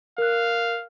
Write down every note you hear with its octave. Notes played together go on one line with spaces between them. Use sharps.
A#4 F5 F#6